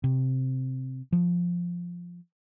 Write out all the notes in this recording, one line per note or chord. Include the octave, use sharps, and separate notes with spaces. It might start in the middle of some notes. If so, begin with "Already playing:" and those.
C3
F3